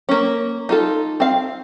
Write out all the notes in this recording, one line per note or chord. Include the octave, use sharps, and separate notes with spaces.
A#3 C#4
D#4 F4 A4
C4 F5